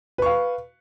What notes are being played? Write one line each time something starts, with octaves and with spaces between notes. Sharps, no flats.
B4 F5 C#6